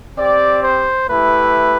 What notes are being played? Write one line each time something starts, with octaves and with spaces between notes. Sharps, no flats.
C4 G4 D5
C5
A3 E4 G4 B4